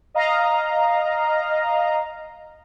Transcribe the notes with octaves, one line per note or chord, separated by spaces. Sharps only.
D#5 F5 A#5